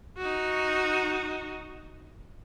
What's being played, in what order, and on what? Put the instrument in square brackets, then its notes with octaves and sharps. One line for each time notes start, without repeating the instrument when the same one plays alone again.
[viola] D#4 F#4